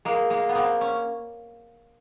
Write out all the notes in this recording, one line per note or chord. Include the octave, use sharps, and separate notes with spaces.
G#3 A#3
G#3 A#3
B3
A#3 C4
C#4